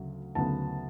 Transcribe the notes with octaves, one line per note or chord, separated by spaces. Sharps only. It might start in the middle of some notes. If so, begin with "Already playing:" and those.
Already playing: D2 C#3 F#3
D2 C#3 F#3 B3 A5